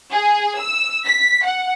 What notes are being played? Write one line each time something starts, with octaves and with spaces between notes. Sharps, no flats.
G#4
E6
B6
F#5